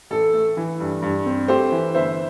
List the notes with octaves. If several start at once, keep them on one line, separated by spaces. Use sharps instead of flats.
A1 A4
A3
E3
G2
G2
C4
A3 G4 C5
E3
G1 C5 E5